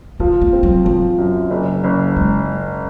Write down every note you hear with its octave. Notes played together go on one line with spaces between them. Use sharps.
F3 C4
A#3
C4
F#3
F3 F#3
F#2
F#1
F#1
G#3